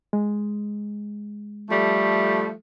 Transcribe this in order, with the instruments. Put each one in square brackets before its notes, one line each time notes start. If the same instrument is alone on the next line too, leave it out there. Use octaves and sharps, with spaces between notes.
[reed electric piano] G#3
[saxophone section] F3 G3 A3